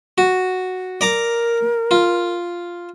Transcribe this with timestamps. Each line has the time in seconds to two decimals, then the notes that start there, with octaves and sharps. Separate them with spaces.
0.18 F#4
1.01 A#4 D5 A#5 D6
1.91 F4